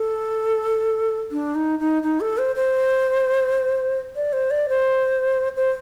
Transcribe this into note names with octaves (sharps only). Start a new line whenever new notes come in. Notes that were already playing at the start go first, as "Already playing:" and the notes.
Already playing: A4
D4
D#4
D#4
D#4
A4
C5
C5
D5
C5
D5
C5
C5